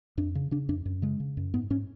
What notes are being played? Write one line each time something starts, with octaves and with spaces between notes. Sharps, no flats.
F2 D4
C#3
C#3 D4
F2 D4
F#2
C#3 G#3
C#3
F#2
G#2 B3
G#2 C#4